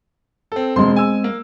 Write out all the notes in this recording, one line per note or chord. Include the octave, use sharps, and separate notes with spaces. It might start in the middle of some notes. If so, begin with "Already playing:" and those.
C4 A4
E1 G#3 C4 C6
G#5 E6
A#3